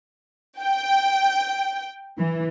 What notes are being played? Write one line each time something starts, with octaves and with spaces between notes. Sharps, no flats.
G5
E3